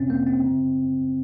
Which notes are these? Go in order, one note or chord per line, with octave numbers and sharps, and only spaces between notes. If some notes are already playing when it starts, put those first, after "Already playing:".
Already playing: F2 C3 D#3 C4 C#4
A#3
C4
F#2 C#3